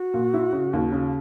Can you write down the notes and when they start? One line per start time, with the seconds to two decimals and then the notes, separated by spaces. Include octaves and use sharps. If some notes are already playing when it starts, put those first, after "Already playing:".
Already playing: F#4
0.14 A#2
0.34 E4
0.53 C#3
0.73 D#2
0.92 C#3